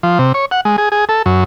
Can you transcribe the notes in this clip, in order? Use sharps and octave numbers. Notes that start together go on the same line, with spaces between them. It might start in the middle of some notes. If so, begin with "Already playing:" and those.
F3
C3
C#5
F#5
G#3
G#4
G#4
A4
F#2